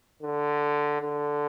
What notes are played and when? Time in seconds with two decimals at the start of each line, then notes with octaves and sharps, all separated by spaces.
0.23 D3
1.01 D3